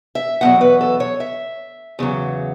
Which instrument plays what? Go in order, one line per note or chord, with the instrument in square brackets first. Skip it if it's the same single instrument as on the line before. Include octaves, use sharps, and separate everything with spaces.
[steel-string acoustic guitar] E5
E2 B2 F#3 F#5
B4
A4
C#5
E5
E2 C#3 F#3